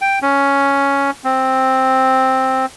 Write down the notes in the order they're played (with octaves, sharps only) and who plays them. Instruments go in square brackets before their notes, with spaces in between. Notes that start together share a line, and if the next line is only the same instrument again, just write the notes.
[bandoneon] G5
C#4
C4